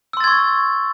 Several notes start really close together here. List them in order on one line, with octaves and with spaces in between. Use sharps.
E6 C6 A6 G#6 C#6